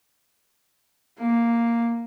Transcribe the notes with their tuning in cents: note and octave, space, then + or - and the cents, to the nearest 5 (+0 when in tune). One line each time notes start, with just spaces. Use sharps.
A#3 +0